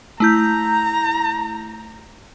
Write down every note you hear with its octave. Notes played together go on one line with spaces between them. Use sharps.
A3 E4 A#5 G6